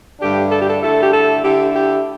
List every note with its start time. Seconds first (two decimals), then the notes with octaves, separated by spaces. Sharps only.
0.20 G2 D3 A3 D4 G4
0.51 A4
0.59 G4
0.68 A4
0.81 D3 A3 E4 A4
1.02 G4
1.12 A4
1.43 D3 A3 E4 G4
1.73 G4